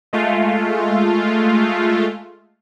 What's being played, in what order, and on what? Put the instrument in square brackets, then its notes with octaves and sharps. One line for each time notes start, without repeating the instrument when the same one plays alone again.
[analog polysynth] G#3 A3 F4